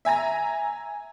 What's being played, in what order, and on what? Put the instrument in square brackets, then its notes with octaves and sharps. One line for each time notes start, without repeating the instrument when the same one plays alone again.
[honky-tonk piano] E5 G#5 A#5 A#6